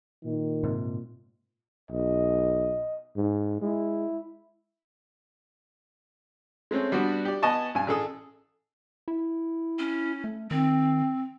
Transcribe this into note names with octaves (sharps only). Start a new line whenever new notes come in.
A#2 D#3
G#2 C3
B1 D#5
G#2
G#3 E4
G#3 A3 C4 C#4
G3 B3 D4 F#4
G4 D5
B3 D#5 G#5 A5 C#6
G2 G#5
A1 G#4 A4 D#6
E4
C#4
A3
D#3 C4